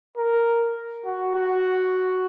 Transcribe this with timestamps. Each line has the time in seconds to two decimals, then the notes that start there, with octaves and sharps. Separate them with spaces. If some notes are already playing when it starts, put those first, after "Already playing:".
0.17 A#4
1.05 F#4
1.35 F#4